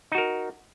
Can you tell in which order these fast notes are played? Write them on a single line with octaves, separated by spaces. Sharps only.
D#4 F#4 A#4